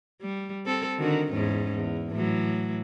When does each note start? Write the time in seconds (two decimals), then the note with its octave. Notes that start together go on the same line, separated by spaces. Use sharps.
0.21 G3
0.66 C4 A4
0.99 D3 D#3 F#4
1.31 E2 G#2 C#4
1.74 E2
2.11 A2 E3 F#3